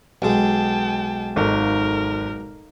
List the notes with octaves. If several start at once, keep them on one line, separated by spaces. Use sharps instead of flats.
B1 G#3 G5 A5
G#1 D#4 A4 A#4 F5